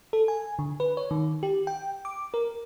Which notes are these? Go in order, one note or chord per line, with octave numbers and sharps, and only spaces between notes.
A4
G#5
D3
B4
C#5
D#3
G4
G5
D6
A#4